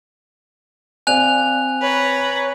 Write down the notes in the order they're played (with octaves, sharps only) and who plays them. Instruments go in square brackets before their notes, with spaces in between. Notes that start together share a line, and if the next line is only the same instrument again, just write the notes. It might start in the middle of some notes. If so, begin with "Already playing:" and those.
[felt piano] C4 D5 F5 [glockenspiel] G#5 F#6 F7
[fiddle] B4 A#5 [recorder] C#5